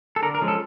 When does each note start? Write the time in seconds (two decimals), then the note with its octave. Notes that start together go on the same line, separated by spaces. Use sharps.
0.16 A4
0.22 D3 A#4
0.35 A#4
0.41 F3 G#3 C#4
0.48 A4